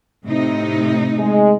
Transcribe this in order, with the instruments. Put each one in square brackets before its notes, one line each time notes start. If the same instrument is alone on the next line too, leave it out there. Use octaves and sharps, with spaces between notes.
[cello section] A2 C3 D#4
[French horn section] G#3